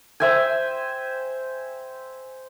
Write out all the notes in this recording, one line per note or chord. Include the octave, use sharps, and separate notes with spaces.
C5 E5 G5 G#5